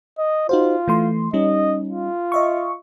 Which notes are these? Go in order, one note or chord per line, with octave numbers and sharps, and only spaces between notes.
D#5
D#4 F4 F#4 C5
E3 A3 C6
G3 C#4 D#4 D#5
F4
D#5 E5 C#6